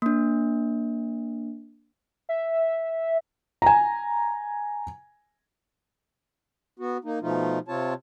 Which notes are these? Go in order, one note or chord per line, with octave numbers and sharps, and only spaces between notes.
A#3 D4
E5
G#5 A#5
B3 F#4
A#3 D#4
B2 F3 A3 D#4 F4
C3 C4 F4 C#5 A5